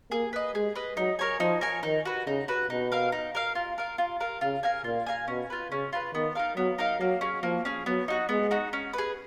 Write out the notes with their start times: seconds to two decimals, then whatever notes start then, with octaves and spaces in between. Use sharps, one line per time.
0.11 A#3 G#4
0.33 B4 D#5
0.54 G#3 G#4
0.75 B4 D#5
0.97 F#3 D#4
1.19 A#4 C#5 G#5
1.40 F3 D#4
1.61 A#4 C#5 G#5
1.83 D#3 D#4
2.05 F#4 B4
2.27 C#3 D#4
2.48 F#4 B4
2.70 B2 D#4
2.92 A#4 F5
3.12 D#4
3.35 A#4 F5
3.55 F4
3.78 A#4 F5
3.98 F4
4.20 A#4 F5
4.41 C#3 F4
4.63 A#4 F5 G#5
4.84 A#2 F4
5.06 A#4 F5 G#5
5.28 B2 C#4
5.50 F4 B4
5.71 C#3 C#4
5.93 F4 B4
6.13 D#3 B3
6.35 D#4 A#4 F5
6.56 F#3 B3
6.78 D#4 A#4 F5
7.00 F#3 A#3
7.21 C#4 G#4
7.43 F3 A#3
7.65 C#4 G#4
7.86 F#3 B3
8.08 D#4 F#4
8.29 G#3 B3
8.51 D#4 F#4
8.73 C#4
8.93 G#4 B4